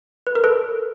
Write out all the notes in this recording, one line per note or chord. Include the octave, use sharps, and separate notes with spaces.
B4
A#4
A4 B4